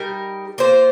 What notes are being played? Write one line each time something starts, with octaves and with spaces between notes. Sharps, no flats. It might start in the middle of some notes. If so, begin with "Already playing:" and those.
Already playing: G3 D#4 A#4
A#3 F4 C5